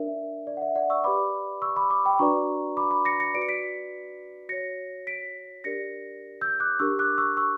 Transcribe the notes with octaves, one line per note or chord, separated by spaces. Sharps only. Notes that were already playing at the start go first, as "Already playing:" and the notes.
Already playing: D4 A#4 D5 E5
D5
F#5
E5
D5 F#5
C#6 E6
G4 B4 D5 B5 D6
C#6 E6
B5 D6
B5 D6
G5 B5
D4 F#4 B4 D5 A#5 C#6
B5 D6
B5 D6
A#6 C#7
A#6 C#7
F#4 B4 D5 D7
C#7
B6 D7
F#4 C#5 A#6 C#7
B6 D7
D4 G4 A#4 D5 A#6 C#7
E6 G6
D6 F#6
D4 G4 A#4 C#6 E6
D6 F#6
C#6 E6
C#6 E6